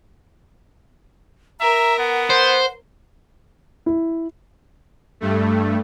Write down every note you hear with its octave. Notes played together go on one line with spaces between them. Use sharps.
A#4 E5 A#5
B3 F#5
C5
E4
G2 A3